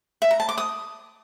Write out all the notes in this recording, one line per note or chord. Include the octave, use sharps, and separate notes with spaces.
E5
A#5
A5
D6
D#6